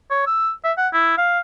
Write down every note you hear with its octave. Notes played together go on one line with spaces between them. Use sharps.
C#5
E6
E5
F#5
E4
F5